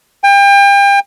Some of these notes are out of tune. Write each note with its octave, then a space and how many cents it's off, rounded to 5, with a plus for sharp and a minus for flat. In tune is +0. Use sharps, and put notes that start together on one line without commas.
G5 +35